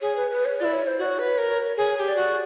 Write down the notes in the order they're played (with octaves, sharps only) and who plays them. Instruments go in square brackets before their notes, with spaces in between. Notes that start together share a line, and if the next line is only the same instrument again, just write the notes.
[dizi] G#4 [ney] C#5
[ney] B4
B4
C#5
[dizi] F4 [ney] D5
[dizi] E4
[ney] C#5
C5
[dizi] F#4 [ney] D5
[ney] C#5
[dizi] B4
A#4
[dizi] G#4 [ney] C#5
[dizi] G#4
G4
[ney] D5
[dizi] F#4